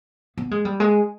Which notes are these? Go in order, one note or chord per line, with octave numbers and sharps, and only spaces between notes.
B3
G#3
G3
G#3